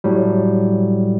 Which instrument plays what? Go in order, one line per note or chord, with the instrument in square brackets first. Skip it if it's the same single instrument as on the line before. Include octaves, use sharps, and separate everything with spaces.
[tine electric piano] A2 F#3 G3